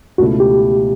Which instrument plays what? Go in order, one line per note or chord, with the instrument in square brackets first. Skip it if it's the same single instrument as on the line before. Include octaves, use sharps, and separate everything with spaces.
[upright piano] C#2 B2 A3 E4 A4 [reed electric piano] F#4
[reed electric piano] G4